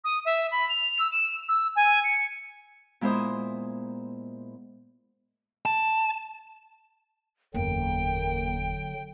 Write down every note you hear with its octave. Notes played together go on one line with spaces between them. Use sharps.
D#6
E5
B5
F7
E6
E7
E6
G#5
C#7
A#2 G#3 B3 E4 C5 D#6
A5
F#1 E2 D3 F#3 A#3 G5